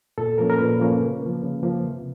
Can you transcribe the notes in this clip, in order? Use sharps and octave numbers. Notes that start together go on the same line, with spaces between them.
A#2 A4
F3 A#3 C#4 A#4
A#4
A#2 B4
F3 A#3 C#4
C#3
F3 A#3
C#3
F3 A#3
C3